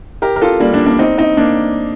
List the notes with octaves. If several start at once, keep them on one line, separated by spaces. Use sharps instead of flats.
G4 A#4
A#4
F4 A4
G3 A#3
A#3 D4
A#3 D4
C4 D#4
C4 D#4
A#3 D4